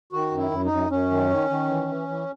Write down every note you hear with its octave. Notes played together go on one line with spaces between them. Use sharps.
D#3 F#4
F#2
E4
F#2
D#4
F#2
F#2 C#4
D#3
D#3
D#3
E3
E3
E3